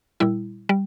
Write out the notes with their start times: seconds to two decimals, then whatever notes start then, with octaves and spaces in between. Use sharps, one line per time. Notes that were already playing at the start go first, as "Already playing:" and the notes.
0.20 A#2 G3 E4
0.69 G3